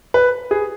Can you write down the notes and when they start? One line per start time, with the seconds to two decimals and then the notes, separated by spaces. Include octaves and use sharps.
0.14 B4
0.51 G#4